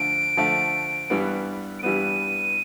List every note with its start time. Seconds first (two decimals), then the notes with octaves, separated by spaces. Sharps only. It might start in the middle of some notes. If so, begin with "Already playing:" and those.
Already playing: D3 F3 A3 D7
0.37 D3 F3 A3
1.10 G2 E3 G3 B3
1.79 D7
1.83 G2 E3 G3 B3 D#7